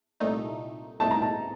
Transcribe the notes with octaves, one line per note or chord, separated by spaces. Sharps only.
C2 A#2 A3 D#4
C2 A#2 A3 D#4 A5
A#5
A5